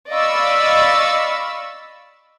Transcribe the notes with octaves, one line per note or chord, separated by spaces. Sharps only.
D5 D#5 F5 B5 C#6 E6